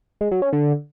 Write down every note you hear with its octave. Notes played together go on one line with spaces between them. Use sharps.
G#3
F#3
C#4
D3